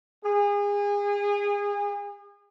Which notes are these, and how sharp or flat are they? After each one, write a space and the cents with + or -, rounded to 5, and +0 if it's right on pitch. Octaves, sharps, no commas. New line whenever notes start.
G#4 -30